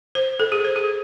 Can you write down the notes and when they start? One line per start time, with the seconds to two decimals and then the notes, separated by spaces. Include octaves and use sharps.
0.15 C5
0.40 A4
0.52 G#4
0.65 C5
0.76 G#4